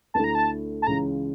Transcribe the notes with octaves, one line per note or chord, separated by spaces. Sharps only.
D2 D3 A3 E4 A5
A#5
A5
A5
C#2 C#3 E3 A#5